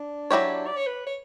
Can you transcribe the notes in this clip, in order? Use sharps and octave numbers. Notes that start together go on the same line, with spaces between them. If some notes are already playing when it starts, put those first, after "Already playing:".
Already playing: D4
F#3 A#3 E4 G4 C#5
D5
C#5
B4
C#5